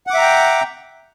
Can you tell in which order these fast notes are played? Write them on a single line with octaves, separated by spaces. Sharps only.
F#5 D6 E5 A#5 G5